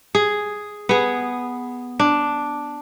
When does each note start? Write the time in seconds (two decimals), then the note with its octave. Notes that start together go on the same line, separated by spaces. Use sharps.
0.15 G#4
0.89 B3 G#4
1.99 D4